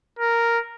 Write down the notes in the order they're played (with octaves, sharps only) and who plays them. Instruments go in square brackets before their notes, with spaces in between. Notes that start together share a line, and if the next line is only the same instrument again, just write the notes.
[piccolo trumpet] A#4